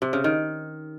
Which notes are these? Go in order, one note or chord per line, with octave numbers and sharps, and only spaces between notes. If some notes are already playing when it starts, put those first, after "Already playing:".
C3
C#3
D#3